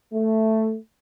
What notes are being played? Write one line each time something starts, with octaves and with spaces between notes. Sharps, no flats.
A3